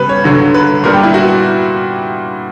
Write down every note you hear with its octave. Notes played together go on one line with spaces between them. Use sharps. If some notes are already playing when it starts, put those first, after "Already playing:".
Already playing: C#3 G3 B3 B4
C#5
G2 D3 F#3
B4
A#2 G3 B3 D4 A#4
G4
E4
F#4